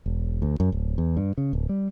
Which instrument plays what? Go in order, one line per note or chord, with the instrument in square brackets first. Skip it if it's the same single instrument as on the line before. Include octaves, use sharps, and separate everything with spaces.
[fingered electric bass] E1
D2
F#2
D1
E2
G2
C#3
D1
G3